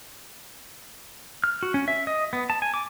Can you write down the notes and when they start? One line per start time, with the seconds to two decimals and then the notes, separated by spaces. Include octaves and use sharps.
1.44 F6
1.63 F#4
1.74 C#4
1.88 E5
2.07 D#5
2.33 B3
2.50 A5
2.62 G#5
2.74 D6